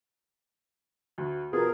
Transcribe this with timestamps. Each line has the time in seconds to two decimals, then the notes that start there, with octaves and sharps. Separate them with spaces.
1.18 D2
1.53 B2 B3 F4 G#4 A#4